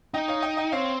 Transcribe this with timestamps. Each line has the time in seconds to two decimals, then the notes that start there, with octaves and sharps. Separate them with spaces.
0.14 D#4 D#5 G5
0.28 C#5 F5
0.42 D#5 G5
0.57 D#5 G5
0.72 C4 C#5 F5